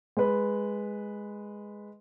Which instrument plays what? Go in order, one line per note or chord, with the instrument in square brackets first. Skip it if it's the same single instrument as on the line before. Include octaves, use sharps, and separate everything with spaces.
[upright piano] G#3 B4